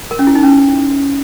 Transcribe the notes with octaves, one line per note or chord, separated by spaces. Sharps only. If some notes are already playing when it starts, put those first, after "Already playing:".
A#4
C#4
E4
D#4
C#4